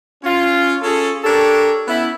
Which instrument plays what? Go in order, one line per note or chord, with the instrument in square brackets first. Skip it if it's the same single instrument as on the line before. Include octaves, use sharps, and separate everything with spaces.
[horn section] C#4 F4
C#4 F4 G#4 A4
D4 G4 A4 A#4 C#5
B3 C#4 E4